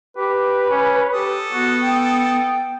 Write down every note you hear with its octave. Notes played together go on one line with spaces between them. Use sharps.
G4 B4
C#4
G4 A4 D#6
B3 F#4
G5